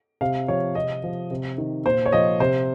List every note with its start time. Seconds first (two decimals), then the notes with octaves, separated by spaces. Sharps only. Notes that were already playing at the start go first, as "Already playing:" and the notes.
0.21 C3 F5
0.48 F3 C#5
0.75 C3 D#5
1.04 F3
1.31 C3
1.58 D#3
1.85 A#2 C5
2.06 C#5
2.12 F3 D#5
2.40 C3 C5